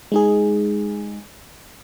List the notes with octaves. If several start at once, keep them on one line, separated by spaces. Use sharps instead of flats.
G#3 D#4 G#4